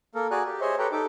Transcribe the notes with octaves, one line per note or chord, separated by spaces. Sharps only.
A#3 A4 A#4
F#4 G#4 D5 G#5 A#5 F#6
G4
G#4 C5 C#5 D#5 E5
G4 A4 B4 C#5 G5 A#5
D#4 G4 A4 D6